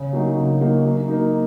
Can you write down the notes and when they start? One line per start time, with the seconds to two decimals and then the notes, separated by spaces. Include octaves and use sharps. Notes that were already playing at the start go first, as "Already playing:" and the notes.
Already playing: C#3
0.13 F#3 A#3 D#4 F#4
0.37 C#3
0.60 F#3 A#3 D#4 F#4
0.85 F#3
1.08 A#3 D#4